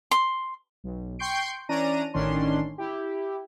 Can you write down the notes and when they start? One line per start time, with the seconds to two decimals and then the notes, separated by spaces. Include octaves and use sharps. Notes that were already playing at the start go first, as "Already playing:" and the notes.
0.11 C6
0.84 B1
1.19 G5 C6 C#6 G6 C7 D7
1.69 E3 C#4 D4 A#5 D#7
2.14 A1 D#3 C#4 D4 C6
2.78 E4 G4